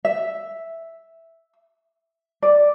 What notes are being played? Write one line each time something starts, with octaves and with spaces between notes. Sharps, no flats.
E5
D5